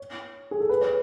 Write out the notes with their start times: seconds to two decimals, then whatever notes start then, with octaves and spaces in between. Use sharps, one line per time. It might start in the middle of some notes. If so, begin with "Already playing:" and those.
Already playing: C#5
0.51 G#4
0.60 A4
0.69 B4
0.81 C#5